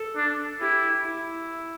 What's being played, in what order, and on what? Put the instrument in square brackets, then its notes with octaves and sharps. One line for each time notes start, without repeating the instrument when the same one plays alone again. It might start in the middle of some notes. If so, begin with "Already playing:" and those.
Already playing: [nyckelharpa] A4
[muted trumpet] D4
[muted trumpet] E4 [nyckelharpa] G4
[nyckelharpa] E4